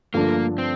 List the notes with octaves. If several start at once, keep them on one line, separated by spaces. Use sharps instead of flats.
G2 D3 F3 A3 A#3 D4
C4